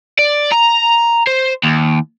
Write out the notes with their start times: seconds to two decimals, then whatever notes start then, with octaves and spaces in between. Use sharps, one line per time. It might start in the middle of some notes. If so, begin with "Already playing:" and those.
0.19 D5
0.52 A#5
1.27 C5
1.63 D#2